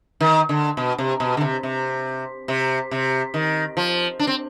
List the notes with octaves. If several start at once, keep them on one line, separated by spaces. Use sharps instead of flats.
D#3
D3
B2
C3
B2
D3
C3
C3
C3
C3
D#3
F3
D4
C4